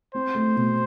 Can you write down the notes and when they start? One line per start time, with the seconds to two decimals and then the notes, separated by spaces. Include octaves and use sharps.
0.14 C4 C5
0.35 A3
0.56 B2